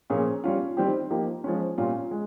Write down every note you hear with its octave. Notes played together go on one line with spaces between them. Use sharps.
A#2 F3 A#3 C#4 G#4
G3 C#4 F4
D#3 G3 C4 G4
F3 A#3 D#4 G4
F3 G#3 C#4
A#2 G3 C#4 F4
G#3